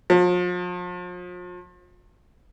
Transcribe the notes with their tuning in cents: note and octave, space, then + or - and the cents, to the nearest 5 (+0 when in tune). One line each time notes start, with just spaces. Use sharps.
F3 +40